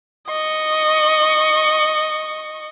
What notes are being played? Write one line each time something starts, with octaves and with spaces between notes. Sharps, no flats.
D#5 C#6